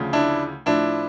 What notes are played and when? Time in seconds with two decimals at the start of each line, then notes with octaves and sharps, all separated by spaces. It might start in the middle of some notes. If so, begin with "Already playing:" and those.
Already playing: D2 C#3 F3
0.13 D4 E4
0.66 A2 F3 D4 E4